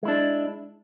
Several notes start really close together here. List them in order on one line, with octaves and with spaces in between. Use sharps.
G#3 E4 D4